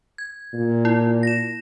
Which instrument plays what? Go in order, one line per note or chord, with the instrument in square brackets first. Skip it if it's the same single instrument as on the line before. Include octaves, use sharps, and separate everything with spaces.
[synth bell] G#6
[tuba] A#2
[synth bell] E4
A#6 E7